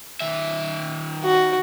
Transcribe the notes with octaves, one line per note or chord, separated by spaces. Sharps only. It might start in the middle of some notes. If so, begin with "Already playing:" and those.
D#3 E5
F#4